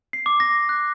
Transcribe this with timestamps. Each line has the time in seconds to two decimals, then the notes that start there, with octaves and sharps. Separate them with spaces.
0.13 C7
0.26 D6
0.40 A#6
0.69 F#6